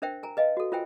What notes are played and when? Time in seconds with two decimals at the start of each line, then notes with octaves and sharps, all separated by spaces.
0.02 D4 A#4 C5 E5 G5
0.23 A#4 G#5 A#5
0.37 B4 D#5 F5 G#5
0.57 F#4 A4
0.72 F4 A#4 C5 E5 G5 G#5